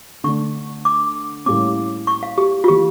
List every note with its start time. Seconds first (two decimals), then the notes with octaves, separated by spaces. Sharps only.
0.24 D3 A3 D4 C#6
0.85 D6
1.46 A2 G3 A#3 C#4 D6
2.07 C#6
2.23 F5
2.38 G4
2.64 F4
2.68 E3 A#3 G4